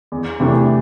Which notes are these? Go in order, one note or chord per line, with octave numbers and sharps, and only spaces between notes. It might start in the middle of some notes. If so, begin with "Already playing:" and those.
E2
C3 E3 A3 D4